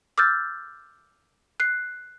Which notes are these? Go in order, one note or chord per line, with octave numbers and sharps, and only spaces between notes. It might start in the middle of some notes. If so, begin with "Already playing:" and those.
D6 E6 F6 G6 A6
F#6 C7